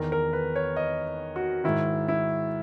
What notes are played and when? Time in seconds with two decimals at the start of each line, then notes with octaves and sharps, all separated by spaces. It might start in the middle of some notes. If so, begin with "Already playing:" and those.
Already playing: E2 D#3 A#4
0.12 A#4
0.33 B4
0.56 C#5
0.76 D#5
1.36 F#4
1.64 G#2 D#3 E4
2.08 E4